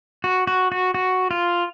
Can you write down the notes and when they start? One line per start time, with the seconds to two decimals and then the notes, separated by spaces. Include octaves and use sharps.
0.24 F#4
0.47 F#4
0.72 F#4
0.94 F#4
1.31 F4